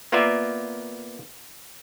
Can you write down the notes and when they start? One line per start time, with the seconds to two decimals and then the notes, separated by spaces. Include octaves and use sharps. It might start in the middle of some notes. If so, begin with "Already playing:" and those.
0.12 A#3 B3 F4 A#4 D5 E5